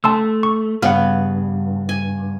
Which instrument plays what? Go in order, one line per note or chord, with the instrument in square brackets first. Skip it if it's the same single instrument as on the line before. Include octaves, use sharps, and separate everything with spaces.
[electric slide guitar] A3 [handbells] A5 C6 E6
[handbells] C#6
[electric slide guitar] G2 [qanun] C#3 B3 [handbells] F#5 F6
[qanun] G#5